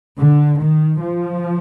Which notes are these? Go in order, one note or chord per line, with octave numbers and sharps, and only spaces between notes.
D3
D#3
F3